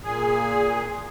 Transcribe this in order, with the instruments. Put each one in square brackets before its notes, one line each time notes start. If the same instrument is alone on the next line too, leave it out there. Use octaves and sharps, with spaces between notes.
[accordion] A#2 G#4